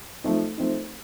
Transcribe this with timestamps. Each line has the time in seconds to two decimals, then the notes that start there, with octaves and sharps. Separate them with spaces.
0.24 F3 A3 C4 D#4
0.58 F3 A3 C4 D#4